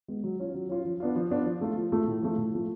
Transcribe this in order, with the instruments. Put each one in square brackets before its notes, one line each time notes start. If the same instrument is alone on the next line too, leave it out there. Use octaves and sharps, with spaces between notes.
[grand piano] G#3 B3
F#3
C#4 F4
F#3
C#4 F4
F3
B3 D4 F4
F3
B3 D4 F4
F3
A3 F4
F3
A3 F4
A2
F3 A3 F4
A2
F3 A3 F4